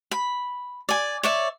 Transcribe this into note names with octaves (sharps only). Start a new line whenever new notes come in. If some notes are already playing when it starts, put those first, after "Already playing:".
B5
D5 G#5
C#5 D5 E5